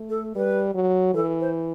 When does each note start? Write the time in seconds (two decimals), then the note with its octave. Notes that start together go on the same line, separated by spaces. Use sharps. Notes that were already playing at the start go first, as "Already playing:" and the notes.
Already playing: A3
0.10 A4
0.36 G3 B4
0.75 F#3
1.14 E3 A4
1.41 C5